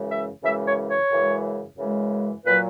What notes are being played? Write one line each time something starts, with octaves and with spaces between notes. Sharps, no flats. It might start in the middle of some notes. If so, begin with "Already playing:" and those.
Already playing: F#2 C#3 E3 G#3
E5
F#2 C#3 E3 G#3 E5
C#5
C#5
F#2 C#3 E3 G#3
F#2 C#3 E3 G#3
A#2 F#3 B4